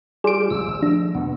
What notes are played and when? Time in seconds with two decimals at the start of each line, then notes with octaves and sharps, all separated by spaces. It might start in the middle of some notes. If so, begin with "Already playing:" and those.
0.24 G3 F4 G4 G#4 D7
0.50 F1 C#2 F#2 E6
0.67 G#1
0.83 F3 A3 D4
1.15 E2 G2 B2 B3